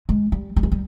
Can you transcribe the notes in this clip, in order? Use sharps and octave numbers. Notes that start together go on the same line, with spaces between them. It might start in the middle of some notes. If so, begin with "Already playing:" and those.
G#3
G3
G3
G#3
G3